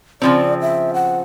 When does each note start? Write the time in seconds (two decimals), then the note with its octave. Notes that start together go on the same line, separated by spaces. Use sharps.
0.22 C#3 F3 C4 D5
0.61 E5
0.94 F#5